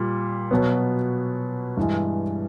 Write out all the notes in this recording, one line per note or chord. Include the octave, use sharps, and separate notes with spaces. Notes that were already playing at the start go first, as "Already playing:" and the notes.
Already playing: A#2 G3
B2 F#3 B3
G2 E3 G#3